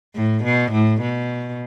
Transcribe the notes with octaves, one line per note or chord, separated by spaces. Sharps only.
A2
B2
A2
B2